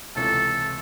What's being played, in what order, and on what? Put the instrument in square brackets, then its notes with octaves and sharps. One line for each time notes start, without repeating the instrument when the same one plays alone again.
[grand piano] C#2 C3 E3 A3 C#4 [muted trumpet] A4